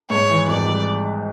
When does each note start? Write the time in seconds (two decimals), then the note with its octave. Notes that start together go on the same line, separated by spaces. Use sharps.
0.10 G#2 C#5
0.29 E3
0.48 G#1 D5
0.65 G3